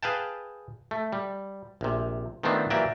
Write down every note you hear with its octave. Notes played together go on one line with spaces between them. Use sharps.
G#4 B4 F5 G5 A5
A3
G3
A#1 C3
D#3 F3 A3 B3 C4 D4
E3 F#3 A#3 G4 D5 E5